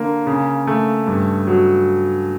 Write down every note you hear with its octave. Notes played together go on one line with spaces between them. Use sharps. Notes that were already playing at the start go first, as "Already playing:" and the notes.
Already playing: D3 A#3
C#3
A3
G2
F#3